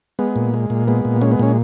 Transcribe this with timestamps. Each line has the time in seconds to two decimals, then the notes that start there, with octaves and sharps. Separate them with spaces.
0.19 G#3 B3
0.36 A#2
0.54 G#3
0.70 A#2
0.87 G#3 B3
1.05 A#2
1.21 G#3 C#4
1.32 B3
1.39 A#2 C#4